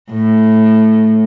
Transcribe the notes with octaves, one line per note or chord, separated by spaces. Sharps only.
A2